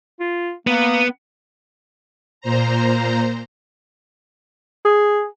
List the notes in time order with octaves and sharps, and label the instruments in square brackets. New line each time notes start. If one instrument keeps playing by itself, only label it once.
[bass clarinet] F4
[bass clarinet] A#3 [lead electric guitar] B3
[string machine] A#2 C5 A#5
[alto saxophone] G#4